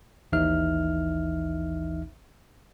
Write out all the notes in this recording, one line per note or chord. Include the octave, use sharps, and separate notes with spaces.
A1 D#2 E3 D#4 E5 F6